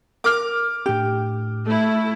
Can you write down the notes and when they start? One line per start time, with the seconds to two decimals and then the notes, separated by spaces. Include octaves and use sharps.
0.24 A#4 D6 F6
0.86 A2 D4 G4
1.65 A3 E4